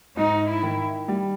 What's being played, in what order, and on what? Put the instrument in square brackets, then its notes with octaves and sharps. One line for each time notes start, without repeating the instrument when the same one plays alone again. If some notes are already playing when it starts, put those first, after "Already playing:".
[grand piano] G#2 [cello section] D#4
[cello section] E4
[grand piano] D#3
G3